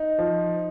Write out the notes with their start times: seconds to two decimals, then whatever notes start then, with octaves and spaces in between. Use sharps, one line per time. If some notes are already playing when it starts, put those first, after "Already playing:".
Already playing: D#4
0.19 F3